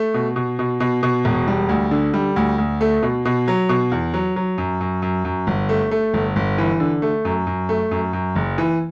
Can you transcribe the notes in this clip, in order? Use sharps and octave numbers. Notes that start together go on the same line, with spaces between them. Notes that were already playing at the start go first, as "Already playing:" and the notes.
Already playing: A3
B2
B2
B2
B2
B2
E1
G3
D2
D3
G3
D2
D2
A3
B2
B2
F#3
B2
E2
F#3
F#3
F#2
F#2
F#2
F#2
G1
A3
A3
G1
G1
E3
D3
A3
F#2
F#2
A3
F#2
F#2
F#1
E3